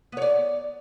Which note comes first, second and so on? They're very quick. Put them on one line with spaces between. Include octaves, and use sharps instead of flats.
B3 C#5 D5